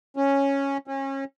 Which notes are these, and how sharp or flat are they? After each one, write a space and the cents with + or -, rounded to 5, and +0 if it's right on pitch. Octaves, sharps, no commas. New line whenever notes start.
C#4 -5
C#4 -30